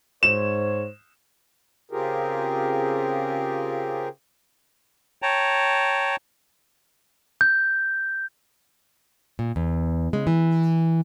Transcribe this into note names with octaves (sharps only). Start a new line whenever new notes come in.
G#2 C5 C#5 E7
C#3 C4 F4 G4 G#4 A#4
C#5 G5 A5 A#5
G6
A#2
E2
C#3 G#3
E3